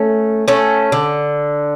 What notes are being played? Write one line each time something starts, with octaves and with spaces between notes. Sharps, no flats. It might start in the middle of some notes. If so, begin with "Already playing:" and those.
Already playing: A3 C#4
A3 C#4
D3